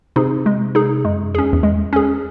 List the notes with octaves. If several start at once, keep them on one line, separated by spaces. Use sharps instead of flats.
C3 D#4 G#4
G#3
D#4 G#4
F#2 G#3
E2 C#4 G#4
E2
G#3
C#4 G#4